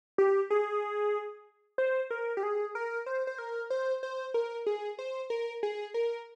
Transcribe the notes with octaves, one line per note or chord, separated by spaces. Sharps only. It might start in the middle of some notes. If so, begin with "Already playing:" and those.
G4
G#4
C5
A#4
G4
G#4
A#4
C5
C5
A#4
C5
C5
A#4
G#4
C5
A#4
G#4
A#4